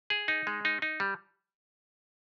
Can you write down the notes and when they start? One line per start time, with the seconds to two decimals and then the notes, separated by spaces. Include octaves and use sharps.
0.10 G#4
0.28 D#4
0.47 G#3
0.65 D#4
0.82 D#4
1.00 G3